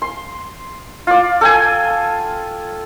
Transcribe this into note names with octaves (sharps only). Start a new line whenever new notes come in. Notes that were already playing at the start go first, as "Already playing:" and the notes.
C6
F4 D5
A4 G5 G#5